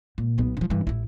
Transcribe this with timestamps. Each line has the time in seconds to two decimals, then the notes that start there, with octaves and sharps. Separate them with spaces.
0.18 A#2
0.38 B1 B3
0.57 D3 F3
0.70 G2 E3
0.87 A1 E4